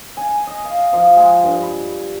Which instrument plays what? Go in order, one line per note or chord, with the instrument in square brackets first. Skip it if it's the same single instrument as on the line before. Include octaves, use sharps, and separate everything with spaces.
[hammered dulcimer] G#5
D#5
F5
F3
G#3
G2
B5